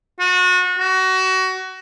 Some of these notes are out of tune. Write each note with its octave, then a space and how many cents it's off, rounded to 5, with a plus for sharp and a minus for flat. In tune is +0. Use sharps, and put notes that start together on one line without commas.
F#4 -30
F#4 +25